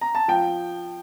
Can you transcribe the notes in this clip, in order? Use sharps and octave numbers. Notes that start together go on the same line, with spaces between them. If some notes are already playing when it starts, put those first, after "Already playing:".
A#5
A5
F3 G5